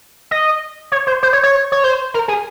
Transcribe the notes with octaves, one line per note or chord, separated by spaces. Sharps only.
D#5
C#5
C5
C5
C#5
C#5
C#5
C5
A#4
G#4